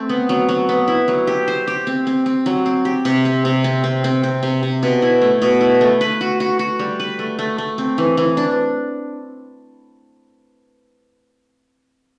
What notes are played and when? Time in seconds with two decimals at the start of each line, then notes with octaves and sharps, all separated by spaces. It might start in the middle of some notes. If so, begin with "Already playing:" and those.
Already playing: A3 C4
0.09 B3
0.29 F#3
0.49 F#3
0.69 B3
0.88 E4
1.08 F#3
1.27 G4
1.48 C5
1.67 G4
1.87 C4
2.07 C4
2.26 C4
2.46 F#3
2.66 C4
2.85 G4
3.05 C3
3.25 C4
3.45 C3
3.64 C4
3.84 C4
4.04 C4
4.23 C4
4.43 C3
4.63 C3
4.83 B2
5.02 E4
5.22 A3
5.42 B2
5.61 E4
5.81 A3
6.01 B4
6.21 F#4
6.40 F#4
6.59 F#4
6.79 G3
7.00 B4
7.19 A3
7.39 A3
7.58 A3
7.78 C4
7.98 E3
8.17 E3
8.37 D4